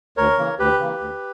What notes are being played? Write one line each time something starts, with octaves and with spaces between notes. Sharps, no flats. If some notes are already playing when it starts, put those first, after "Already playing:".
D2 A#4 C#5
C#3 E3 A#3
D2 G4 B4
C#3 E3 A#3
D2